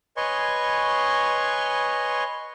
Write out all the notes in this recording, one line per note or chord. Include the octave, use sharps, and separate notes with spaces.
B4 C#5 D#5 G#5 C6 C#6